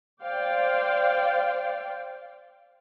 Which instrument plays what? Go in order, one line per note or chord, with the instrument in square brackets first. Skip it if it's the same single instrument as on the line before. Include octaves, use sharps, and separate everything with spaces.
[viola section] C5 D5 F5 G5